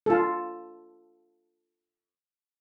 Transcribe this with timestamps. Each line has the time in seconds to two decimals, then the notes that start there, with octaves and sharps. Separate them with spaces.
0.06 F4 A4